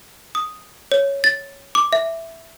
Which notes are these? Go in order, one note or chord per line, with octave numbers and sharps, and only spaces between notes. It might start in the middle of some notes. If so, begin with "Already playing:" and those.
D#6
C#5
A6
D6
E5